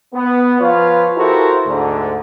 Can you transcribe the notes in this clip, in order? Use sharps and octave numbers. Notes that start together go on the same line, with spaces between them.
B3
F3 F4 B4 C#5 F5
E4 F#4 G4 A4 A#4 C5
D2 G#2 D3